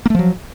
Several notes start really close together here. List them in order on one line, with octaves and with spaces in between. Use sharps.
A#3 A3 F3 F#3